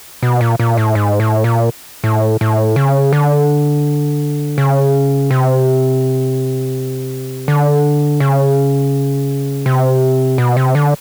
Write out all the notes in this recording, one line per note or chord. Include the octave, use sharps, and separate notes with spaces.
B2
A#2
A#2
A2
G#2
A2
A#2
A2
A2
C#3
D3
C#3
C3
D3
C#3
C3
B2
C3
D3